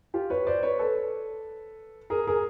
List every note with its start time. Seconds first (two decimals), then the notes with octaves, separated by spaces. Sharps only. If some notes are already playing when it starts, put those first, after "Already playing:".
0.14 F4 G4
0.30 B4 C#5
0.47 C5 D5
0.63 B4 C#5
0.79 A4 B4
2.10 G#4 A#4
2.27 G#4 A#4